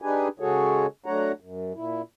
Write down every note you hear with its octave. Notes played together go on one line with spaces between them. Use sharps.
D4 D#4 G4 G#4 B4 G#5
C#3 G#3 F#4 G#4 A4 C#5
F#3 A3 D4 C#5 F#5 A#5
F#2
A#2 E4